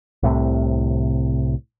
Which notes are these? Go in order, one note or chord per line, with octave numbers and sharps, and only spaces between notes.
C2 A2 C3